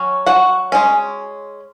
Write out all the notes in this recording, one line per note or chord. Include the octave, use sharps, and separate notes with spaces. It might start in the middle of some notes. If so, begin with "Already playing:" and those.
Already playing: F#3 C#4
F#4 F#5
G#3 C#4